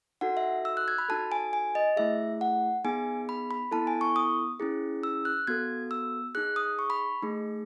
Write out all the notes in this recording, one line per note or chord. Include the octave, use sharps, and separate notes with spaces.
D#4 F#4 A4 F#5
E5
E6
F#6
G#6
B5
D#4 F#4 A4 A5
G#5
G#5
D#5
A3 E4 G#4 E5
F#5
B3 D#4 G#4 G#5
B5
B5
B3 E4 A4 A5
G#5
C#6
D#6
C#4 E4 G#4
E6
F#6
B3 F#4 A4 G#6
E6
D#4 G#4 F#6
D#6
C#6
B5
A3 D#4 G#4